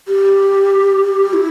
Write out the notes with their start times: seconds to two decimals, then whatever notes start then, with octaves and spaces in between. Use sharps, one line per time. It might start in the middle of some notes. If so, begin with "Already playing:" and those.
0.08 G4
1.29 G4
1.34 E4